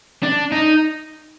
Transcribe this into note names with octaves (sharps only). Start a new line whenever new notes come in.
D4
D#4